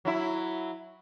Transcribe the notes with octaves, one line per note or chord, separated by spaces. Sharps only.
F#3 E4